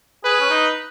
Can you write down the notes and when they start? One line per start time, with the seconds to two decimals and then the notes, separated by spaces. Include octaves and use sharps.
0.24 G#4 B4
0.41 C#4
0.50 D#4